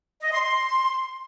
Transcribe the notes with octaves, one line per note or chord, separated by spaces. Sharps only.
D#5
C6
C6